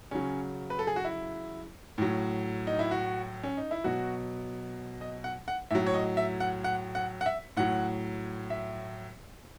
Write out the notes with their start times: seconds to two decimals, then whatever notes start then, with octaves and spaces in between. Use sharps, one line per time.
0.11 C#3 F#3 C#4
0.70 B4
0.79 A4
0.87 G#4
0.96 F#4
1.04 E4
1.98 A2 F#3
2.67 D#4
2.79 E4
2.91 F#4
3.43 C#4
3.57 D#4
3.71 E4
3.84 B2 F#3 F#4
5.01 D#5
5.24 F#5
5.48 F#5
5.71 A2 F#3 E5
5.86 C#5
5.94 D#5
6.17 E5
6.40 F#5
6.64 F#5
6.95 F#5
7.21 F#5
7.26 E5
7.57 A2 F#3 F#5
8.50 E5